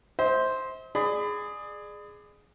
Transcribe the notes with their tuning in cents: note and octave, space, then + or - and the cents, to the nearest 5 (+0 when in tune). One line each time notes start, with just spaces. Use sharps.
C5 +0 E5 -45
G#4 +5 D5 +30 B5 +30